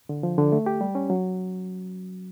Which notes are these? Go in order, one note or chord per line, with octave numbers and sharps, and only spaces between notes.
D3
F3
D3
A3
G4
G3
C#4
F#3